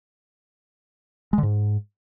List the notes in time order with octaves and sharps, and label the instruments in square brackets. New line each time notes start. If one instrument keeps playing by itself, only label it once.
[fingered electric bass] G#3
D3
G#2